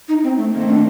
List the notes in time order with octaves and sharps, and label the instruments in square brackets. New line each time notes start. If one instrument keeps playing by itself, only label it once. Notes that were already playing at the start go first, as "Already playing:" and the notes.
[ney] D#4
C4
A3
[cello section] D#3 A3 C4 [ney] A#3
[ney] D4